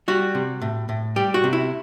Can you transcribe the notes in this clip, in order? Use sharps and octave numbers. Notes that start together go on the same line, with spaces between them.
G3 F#4
C3
A2
A2
G3 G4
F#4
C3
E4